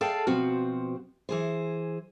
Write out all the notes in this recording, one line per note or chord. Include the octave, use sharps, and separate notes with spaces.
G#4 A4 D5 F5 G5 A5
B2 F3 C4 F#4
E3 G#4 C5